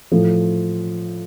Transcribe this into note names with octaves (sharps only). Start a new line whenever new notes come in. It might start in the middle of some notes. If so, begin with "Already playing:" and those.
A2 F3 A3